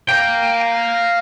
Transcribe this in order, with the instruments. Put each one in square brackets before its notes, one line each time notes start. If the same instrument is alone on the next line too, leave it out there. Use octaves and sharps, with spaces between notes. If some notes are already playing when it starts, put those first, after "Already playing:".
[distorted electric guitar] F5 A#5 [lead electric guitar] G5